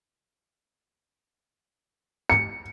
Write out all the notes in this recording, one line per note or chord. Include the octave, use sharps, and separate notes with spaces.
C#7